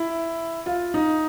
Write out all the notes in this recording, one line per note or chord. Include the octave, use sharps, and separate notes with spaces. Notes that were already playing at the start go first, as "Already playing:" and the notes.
Already playing: E4
F4
D#4